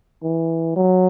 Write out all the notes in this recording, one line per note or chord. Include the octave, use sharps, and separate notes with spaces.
E3
F#3